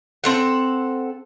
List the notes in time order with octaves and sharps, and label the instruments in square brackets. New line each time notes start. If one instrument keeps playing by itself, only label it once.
[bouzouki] C4 A4 F#5